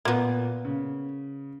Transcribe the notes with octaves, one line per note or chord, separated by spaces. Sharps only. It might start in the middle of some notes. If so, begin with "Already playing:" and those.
A#2 A#3 B3
C#3